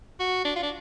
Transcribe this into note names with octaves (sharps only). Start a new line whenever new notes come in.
F#4
D4
F4
D4